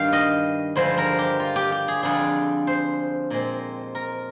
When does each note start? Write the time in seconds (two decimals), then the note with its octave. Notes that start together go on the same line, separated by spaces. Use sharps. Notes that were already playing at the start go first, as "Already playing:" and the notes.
Already playing: G2 D#3 G3 F5 G5
0.13 D#5
0.76 G2 D3 F3 G#3 C5
0.98 A#4
1.19 G4
1.40 F4
1.56 G4
1.72 G4
1.88 G#4
2.03 F2 D3 G3 D4 F4 G#4
2.67 C5
3.30 A#2 G#3 C4
3.95 A#4